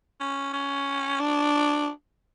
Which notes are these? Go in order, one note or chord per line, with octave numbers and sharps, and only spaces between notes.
C#4
C#4
D4